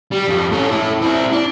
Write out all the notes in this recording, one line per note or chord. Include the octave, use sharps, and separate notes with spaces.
G3
F2 F4
C#4 A4
E4 A4
C4 E4
D4